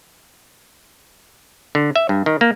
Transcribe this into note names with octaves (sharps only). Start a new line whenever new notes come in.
D3
E5
G2
D#3
A#3